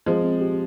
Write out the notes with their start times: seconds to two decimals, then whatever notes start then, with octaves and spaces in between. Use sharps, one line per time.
0.06 F3 G#3 C4
0.24 C4
0.41 G4